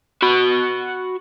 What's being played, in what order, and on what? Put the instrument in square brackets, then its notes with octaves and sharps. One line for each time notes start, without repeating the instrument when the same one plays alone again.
[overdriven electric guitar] F#4 B5